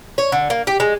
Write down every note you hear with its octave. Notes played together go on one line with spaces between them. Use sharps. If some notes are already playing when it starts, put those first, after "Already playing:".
C#5
D3
A#3
G4
G#3